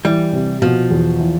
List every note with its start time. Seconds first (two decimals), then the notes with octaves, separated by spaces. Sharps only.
0.05 E3 G3
0.33 C3
0.62 B2 F3
0.91 E2
1.20 E3